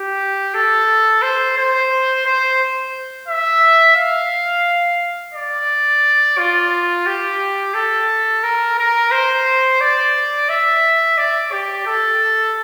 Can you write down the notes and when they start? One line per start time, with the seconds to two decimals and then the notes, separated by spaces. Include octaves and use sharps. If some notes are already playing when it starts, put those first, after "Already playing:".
Already playing: G4
0.54 A4
1.22 C5
1.57 C5
2.26 C5
3.28 E5
3.96 F5
5.34 D5
6.38 F4
7.06 G4
7.74 A4
8.44 A#4
8.78 A#4
9.11 C5
9.81 D5
10.49 E5
11.18 D5
11.52 G4
11.86 A4